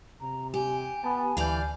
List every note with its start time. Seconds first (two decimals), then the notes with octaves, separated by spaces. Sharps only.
0.21 C3 A#5
0.54 G4 G#5
1.04 B3 A5
1.37 D2 E3 D5 F5 G6